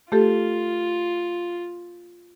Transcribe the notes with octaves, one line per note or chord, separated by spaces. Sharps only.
A3 F4 G4 A4